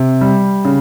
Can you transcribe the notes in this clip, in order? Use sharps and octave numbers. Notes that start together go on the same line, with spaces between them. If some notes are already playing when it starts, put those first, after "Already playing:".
Already playing: C3
G3
C#3